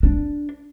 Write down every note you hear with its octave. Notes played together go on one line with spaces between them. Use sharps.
D4